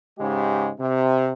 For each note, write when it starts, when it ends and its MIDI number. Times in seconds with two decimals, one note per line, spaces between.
0.19 0.70 44
0.19 0.70 49
0.19 0.70 56
0.19 0.70 67
0.80 1.33 48